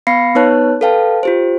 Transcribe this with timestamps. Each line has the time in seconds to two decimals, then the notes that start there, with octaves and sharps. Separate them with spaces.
0.07 B3 F5 B5 A#6 C7 C#7
0.35 B3 D#4 B4 C#5 A5 F#6
0.81 A4 B4 F5 G5 A5
1.23 F4 G4 C5